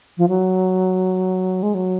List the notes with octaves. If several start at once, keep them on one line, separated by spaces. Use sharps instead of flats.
F3
F#3
G#3
F#3